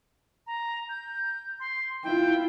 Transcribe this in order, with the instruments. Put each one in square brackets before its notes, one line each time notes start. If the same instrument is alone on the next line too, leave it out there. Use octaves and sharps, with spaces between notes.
[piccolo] A#5
G6
C6
[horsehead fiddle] E4 F4 [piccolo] G5